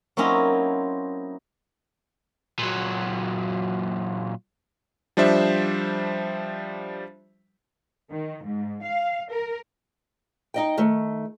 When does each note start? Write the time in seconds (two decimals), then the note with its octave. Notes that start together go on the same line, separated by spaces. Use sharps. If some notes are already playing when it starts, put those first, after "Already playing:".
0.17 F#3 A#3 C4 C#4 D#4 E4
2.59 A#2 F#3
5.17 F3 G3 D4 C5 E5
8.12 D#3
8.45 G#2
8.83 F5
9.32 A#4
10.54 D#4 D#5 G5
10.77 D#3 A3